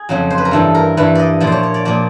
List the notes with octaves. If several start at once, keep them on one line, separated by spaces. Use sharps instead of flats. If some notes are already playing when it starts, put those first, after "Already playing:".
Already playing: G#4
F2 C#3 F#3
C5
B4
A#4
G2 E3 G3 A4
A#4
G2 E3 G3 B4
D5 D#5
A#2 F3 D5
C5 C#5
C#5
D5
A#2 F3 D5